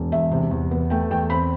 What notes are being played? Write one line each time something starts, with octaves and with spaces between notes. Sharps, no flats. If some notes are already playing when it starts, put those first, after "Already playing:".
Already playing: E1
E2 E5
C3
E2
B3
A3 G5
E2 G5
C4 B5